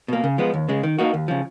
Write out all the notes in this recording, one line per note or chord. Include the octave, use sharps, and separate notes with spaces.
B2 A#3
C#3
F3 G#3 B3
D#2
C#3 G#3
D#3
A#3 D#4 F#4
D#2
C#3 F3